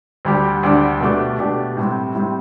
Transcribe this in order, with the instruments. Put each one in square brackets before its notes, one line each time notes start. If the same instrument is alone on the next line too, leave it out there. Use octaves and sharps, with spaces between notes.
[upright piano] D2 D3 G3 D4 G4
D2 D3 G3 D4 G4
B2 A3 D4 G4
B2 A3 D4 G4
A2 G3 C4
A2 G3 C4